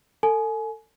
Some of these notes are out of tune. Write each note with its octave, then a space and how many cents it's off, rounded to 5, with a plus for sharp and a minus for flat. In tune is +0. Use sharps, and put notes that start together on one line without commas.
A4 +30 G#5 +30